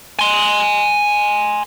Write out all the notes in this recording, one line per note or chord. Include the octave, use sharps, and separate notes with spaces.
G#5 C6